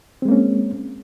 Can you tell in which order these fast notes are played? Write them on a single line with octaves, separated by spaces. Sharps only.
C4 G#3 A#3 C#4